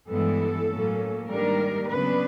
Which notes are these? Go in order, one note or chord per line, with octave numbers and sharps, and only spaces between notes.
G2 E3 G#3 B3 E4 A4
A2 F#3 A#3 C#4
G#2 D#3 G3 A#3 D4 A#4
C#3 F#3 B3 D4 B4